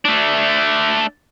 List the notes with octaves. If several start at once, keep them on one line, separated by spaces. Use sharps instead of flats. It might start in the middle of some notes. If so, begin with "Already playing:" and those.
A3 D4